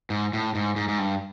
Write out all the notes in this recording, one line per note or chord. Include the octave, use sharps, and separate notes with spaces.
G#2
A2
G#2
G#2
G#2
G2